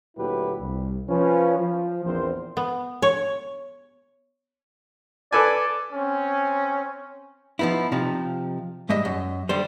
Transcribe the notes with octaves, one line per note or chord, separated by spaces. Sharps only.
D2 A#2 F#3 E4 G4 B4
C2
F3 C#4 B4
F3
A#1 E2 C4 A#4 C5
B3
C#5
A4 B4 D5 G#5
C4 C#4
F3 F#3 B3 D#4 E4
C3 F3 D#4
G#2 G3 G#3 D#5 E5
F#2
D3 G3 C5